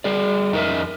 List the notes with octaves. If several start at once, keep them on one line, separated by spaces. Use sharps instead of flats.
G3 G#4 D5
F2 D#4 F#4 A#4 E5